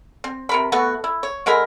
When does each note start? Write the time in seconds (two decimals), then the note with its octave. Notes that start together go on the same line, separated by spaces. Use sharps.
0.24 C4
0.49 C3 A#4 B5
0.72 A3 B3 F#4
1.04 E4
1.23 C#5
1.46 D3 G#3 A#4 B5